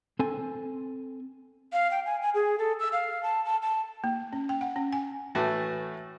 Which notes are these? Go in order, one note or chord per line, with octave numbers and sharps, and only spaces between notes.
C4 A4 G#5
F5
G5
G#5
G#5
G#4
A4
E6
F5
A5
A5
A5
A#3
C#4
G5
F#5
C#4
G#5
A2 E3 A3 F#4